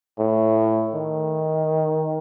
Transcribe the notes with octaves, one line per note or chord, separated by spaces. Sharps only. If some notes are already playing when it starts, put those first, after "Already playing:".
A2
D#3